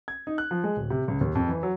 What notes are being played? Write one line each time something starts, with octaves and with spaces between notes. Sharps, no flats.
G#6
D#4
F#6
F3
G#3
D1
C3
C#2
D#2
F2
E3
F#3